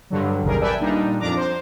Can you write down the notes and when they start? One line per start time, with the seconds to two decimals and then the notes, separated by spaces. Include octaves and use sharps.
0.10 G2 D3 F#3
0.43 A1 D#2 C3 G3 G#4 A#4
0.60 A4 B4 D5 E5 G5 G#5
0.80 A#2 G3 D4 D#4
1.20 F2 F3 D4 A#5 D6
1.37 C5